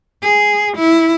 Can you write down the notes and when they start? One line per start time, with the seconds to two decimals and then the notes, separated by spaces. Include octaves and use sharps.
0.23 G#4
0.77 E4